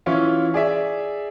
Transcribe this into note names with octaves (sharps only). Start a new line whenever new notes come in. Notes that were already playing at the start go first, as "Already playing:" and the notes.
E3 C#4 E4 F4
G#4 D5 E5